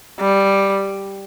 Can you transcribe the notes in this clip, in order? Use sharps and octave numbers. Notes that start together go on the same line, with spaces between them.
G3